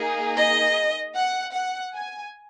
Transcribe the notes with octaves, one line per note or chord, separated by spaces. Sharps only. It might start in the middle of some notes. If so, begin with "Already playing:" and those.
Already playing: A#3 D#4 G#4
D#5
F#5
F#5
G#5